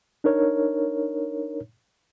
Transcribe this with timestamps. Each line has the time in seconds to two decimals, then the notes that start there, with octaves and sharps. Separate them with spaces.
0.24 D4 D#4 A#4 C#5